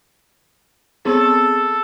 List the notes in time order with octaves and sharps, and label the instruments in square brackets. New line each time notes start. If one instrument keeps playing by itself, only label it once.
[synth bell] B3 C4 G#4 [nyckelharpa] A4